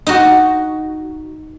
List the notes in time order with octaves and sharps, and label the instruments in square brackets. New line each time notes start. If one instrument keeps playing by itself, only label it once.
[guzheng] D#4 F#4